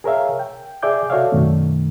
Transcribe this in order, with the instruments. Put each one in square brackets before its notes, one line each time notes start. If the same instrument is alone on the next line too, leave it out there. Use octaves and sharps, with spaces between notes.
[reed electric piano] G#4 A#4 C#5 E5 F5
G5
G#4 D5 E5 D6 G6
F#4 A4 C#5 D5 E5 F5
F#2 B2 D#3 A3